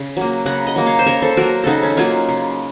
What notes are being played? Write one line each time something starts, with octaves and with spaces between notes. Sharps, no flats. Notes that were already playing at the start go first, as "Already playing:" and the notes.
Already playing: C#3
F#3 A#3
C#3 F#5 A#5
D#5 F#5
F#3 A#3
C#5 F5
C5
C#3 A#4 C#5
A4 C5
F#3 A#3 F#4 A#4
C#3 D#4 F#4 A4
C#4
D#4
F#3 A#3 C#4 F4
C#3